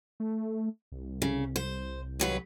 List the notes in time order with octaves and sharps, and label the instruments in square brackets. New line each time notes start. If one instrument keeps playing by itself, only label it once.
[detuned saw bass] A3
C2
[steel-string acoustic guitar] C#3
C5
D#2 F#3 B4